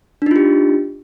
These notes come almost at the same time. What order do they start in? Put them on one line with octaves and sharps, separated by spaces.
D4 D#4 F4 G4